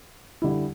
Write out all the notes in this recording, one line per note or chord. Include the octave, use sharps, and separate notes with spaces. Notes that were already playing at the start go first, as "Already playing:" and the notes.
D3 G3 E4